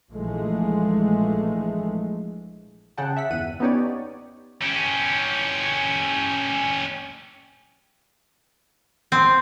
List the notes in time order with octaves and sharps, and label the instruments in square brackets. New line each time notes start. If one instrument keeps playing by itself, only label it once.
[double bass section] A#1 A#2 E3 F3 G#3 A3
[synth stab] C#3 G#4 F#5 G5 A5
E5 F#5 B6
G1 E2 F#5 D#7
B3 C#4 D#4 G4 C#5 D5
[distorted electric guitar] C#4 G4
[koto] C4